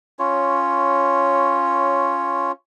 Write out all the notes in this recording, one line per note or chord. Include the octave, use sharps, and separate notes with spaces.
C#4 F4 C#5